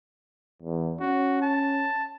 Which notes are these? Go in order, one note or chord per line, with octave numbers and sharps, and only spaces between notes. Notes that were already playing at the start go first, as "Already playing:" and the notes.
E2
C#4 F#4
A5